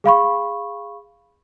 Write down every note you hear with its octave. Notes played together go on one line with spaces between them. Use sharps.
G#4 F5 B5 C#6